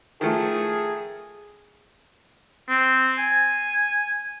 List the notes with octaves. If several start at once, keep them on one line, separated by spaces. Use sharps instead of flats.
D#3 F3 A3 G#4
C4
G#5